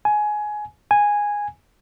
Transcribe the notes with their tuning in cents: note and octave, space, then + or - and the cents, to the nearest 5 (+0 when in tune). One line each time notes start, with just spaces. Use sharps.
G#5 +15
G#5 -10